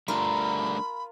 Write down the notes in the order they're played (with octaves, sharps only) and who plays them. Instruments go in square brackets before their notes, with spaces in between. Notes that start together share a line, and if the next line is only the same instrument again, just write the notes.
[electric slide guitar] G3 A3 D4 [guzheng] F4 A#4 [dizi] B5